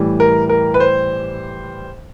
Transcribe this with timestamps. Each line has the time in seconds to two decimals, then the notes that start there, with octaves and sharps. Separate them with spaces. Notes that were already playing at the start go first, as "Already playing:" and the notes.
Already playing: A2 E3 G3
0.20 A#4
0.49 A#4
0.74 B4
0.80 C5